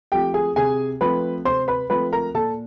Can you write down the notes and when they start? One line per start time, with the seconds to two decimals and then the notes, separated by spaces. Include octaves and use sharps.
0.12 F3 A3 C4 G4 G5
0.34 G#4 G#5
0.56 C3 G#4 G#5
1.01 F3 A3 C4 B4 B5
1.45 C3 C5 C6
1.68 B4 B5
1.90 F3 A3 C4 B4 B5
2.13 A#4 A#5
2.34 A#2 A4 A5